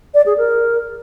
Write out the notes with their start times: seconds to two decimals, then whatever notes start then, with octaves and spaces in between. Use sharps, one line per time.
0.14 D5
0.26 G#4
0.37 A#4